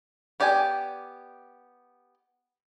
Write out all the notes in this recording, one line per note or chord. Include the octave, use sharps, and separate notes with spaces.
B3 G4 D5 G5 G#5